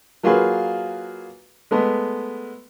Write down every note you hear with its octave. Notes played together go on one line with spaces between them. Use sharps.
F#3 A#3 F4 F#4 G#4 B4
G#3 A3 B3